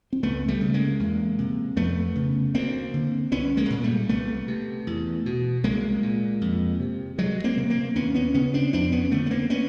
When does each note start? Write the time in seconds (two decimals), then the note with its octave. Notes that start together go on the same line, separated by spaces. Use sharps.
0.13 C4
0.23 C#2 A3 B3
0.48 G3 A3
0.61 C#3
0.74 G#3 A#3
1.00 E2
1.39 C3
1.77 F2 A3 B3
2.15 C#3
2.54 D2 A#3 C4
2.94 D3
3.32 C2 B3 C#4
3.57 G#3 A#3
3.70 A#2
3.83 G3 A3
4.09 C2 A3 B3
4.48 C3
4.87 E2
5.26 B2
5.64 C2 G#3 A#3
6.03 A#2
6.41 F2
6.80 C3
7.18 D2 F#3 G#3
7.44 A#3 C4
7.57 C3
7.70 A#3 C4
7.95 D#2 B3 C#4
8.15 B3 C#4
8.34 C#3 B3 C#4
8.54 C4 D4
8.73 F2 C4 D4
8.92 B3 C#4
9.11 D3 A3 B3
9.26 B3
9.31 A#3 C4
9.50 B3 C#4